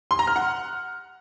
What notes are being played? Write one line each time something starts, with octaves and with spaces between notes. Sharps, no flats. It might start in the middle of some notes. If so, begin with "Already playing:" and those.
C6
A#5
F6
F#5